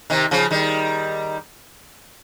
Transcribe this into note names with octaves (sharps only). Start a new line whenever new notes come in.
C3 D#3
C#3 F3
D#3 G3